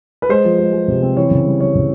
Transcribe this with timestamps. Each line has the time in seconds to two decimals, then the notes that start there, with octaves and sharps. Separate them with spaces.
0.22 B4
0.29 G#3 C5
0.45 F3
0.59 G#3
0.73 G#3
0.88 C3
1.02 C4
1.17 E3 C#5
1.31 C#3
1.45 G3
1.60 G3 C#5
1.75 C#3